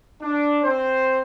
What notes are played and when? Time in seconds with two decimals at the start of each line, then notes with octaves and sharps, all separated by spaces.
0.21 D4
0.64 C4 C5